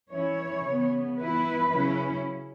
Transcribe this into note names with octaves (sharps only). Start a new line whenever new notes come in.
E3 C#4 E4 C#5
C#3 E3 B3
E3 B3 E4 B4
C#3 F#3 C#4 E4